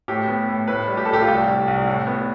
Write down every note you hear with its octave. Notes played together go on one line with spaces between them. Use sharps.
A2 G4
B3
A2
A2 B4
G3
G4
A2 A4
G4
F4
C2 G4
G3
C2
A2
B3